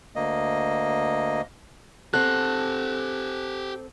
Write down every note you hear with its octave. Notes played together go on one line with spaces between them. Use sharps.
D2 A#3 D#5
C4 G4 A4 F#5 F#6